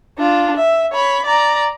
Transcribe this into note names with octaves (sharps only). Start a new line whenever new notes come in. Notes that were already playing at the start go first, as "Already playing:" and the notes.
D4 F4
E5
C#5 B5
D5 A#5